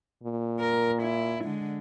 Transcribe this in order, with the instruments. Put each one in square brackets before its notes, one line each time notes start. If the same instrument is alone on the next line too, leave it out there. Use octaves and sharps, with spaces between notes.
[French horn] A#2
[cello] A#4
E4
D3 G#3